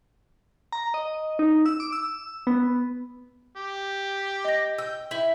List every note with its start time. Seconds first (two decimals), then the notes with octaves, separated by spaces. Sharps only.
0.72 A#5
0.94 D#5
1.39 D#4
1.66 E6
1.80 D6
1.92 E6
2.47 B3
3.57 G4
4.45 D#5 A#6
4.78 G5 E6
5.11 E4